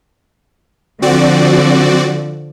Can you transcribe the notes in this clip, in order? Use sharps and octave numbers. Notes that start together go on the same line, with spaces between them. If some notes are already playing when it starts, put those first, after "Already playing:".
D3 F3 C4 F#4 D5